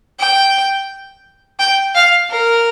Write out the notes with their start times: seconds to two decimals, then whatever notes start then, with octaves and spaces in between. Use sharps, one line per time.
0.19 G5
1.59 G5
1.95 F5
2.30 A#4